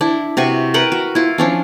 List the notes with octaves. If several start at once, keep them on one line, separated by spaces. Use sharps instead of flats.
D4 E4
C3 F#4 B4 C#6
A#4 B4 F#5 G5
F#4
E4 F4
F3 C#4 D4